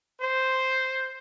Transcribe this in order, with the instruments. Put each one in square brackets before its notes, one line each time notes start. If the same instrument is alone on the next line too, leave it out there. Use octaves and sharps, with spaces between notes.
[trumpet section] C5